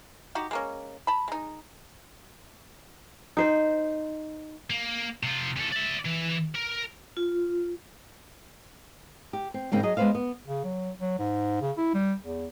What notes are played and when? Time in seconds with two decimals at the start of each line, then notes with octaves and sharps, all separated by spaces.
0.35 D#4 F#4 G4
0.51 G#3 A#3 C#4
1.07 A5 B5
1.28 G#3 D#4
3.37 D#4 C5
4.70 A#3
5.23 C3 F4
5.56 E2 A4
5.72 D5 E5
6.06 E3
6.55 A#4
7.17 F4
9.33 G4
9.54 C4
9.72 G#2 C#3 A#3 C4
9.83 F#3 G#4 D#5
9.97 G#3 B3 D4 B4 C5 F5
10.15 B3
10.47 C#3
10.64 F#3
11.01 F#3
11.19 G#2
11.61 C#3
11.78 E4
11.94 G3
12.23 E2